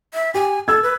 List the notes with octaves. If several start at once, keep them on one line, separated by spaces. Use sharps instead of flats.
E5
G4 G#5
A4 E6 G#6
B4